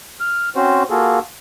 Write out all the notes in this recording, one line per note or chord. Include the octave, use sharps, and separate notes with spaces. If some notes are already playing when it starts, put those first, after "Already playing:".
F6
C4 C#4 F#4 C5
A#3 F4 F#4 G#4 A4